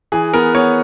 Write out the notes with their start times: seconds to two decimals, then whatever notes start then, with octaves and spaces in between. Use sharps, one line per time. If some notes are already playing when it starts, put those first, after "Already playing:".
0.12 E3 G#4
0.33 B3 A#4
0.55 B3 C#5